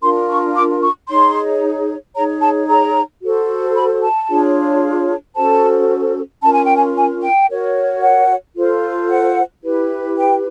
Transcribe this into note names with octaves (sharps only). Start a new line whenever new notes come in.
D4 F4 A#4 C6
C#6
D6
C#6
D#4 G#4 C#5 C6
D#4 G#4 C#5 A#5
A5
A#5
F#4 A4 C5
B5
A5
D4 F4 G#4 C#5
C#4 F#4 A4 C5 A5
C#4 F4 A#4 A5
G#5
G5
G#5
G#5
G5
F#4 A#4 C#5
F#5
F4 A4 C5
F#5
E4 G4 B4
G5